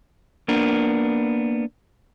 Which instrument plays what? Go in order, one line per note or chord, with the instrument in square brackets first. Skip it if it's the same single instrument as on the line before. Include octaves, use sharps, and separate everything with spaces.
[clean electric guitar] A#3 B3 D4 A#4